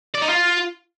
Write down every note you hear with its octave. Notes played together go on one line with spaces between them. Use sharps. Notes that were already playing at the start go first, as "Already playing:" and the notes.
D5
D#4
F4